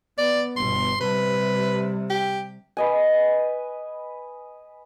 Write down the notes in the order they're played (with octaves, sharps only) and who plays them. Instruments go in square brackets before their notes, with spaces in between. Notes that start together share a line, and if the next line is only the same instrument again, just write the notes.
[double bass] B3 [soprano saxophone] D5
[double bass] G1 B2 [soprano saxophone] C6
[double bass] C3 G3 [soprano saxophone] B4
[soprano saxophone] G4
[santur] B4 D#5 G#5